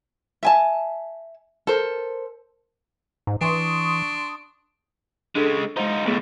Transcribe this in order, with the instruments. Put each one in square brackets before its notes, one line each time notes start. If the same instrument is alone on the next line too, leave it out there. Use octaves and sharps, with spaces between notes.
[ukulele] E5 G#5 A5
A4 A#4 C5
[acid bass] G#2
[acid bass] E3 [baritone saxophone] D4 [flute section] C6 C#6 D#6
[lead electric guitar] C#3 G#3 [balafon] D4 A4
[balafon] G#3 C5 [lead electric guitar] D#4 F4
[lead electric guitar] B1 A2 [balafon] A3 B3 G#4